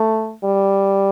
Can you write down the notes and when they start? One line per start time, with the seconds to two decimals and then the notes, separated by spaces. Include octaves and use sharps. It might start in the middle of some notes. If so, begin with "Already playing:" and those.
Already playing: A3
0.45 G3